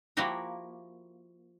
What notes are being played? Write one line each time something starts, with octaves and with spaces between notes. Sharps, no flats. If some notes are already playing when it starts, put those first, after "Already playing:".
F3 A#3 E4 F#4 G4 A#4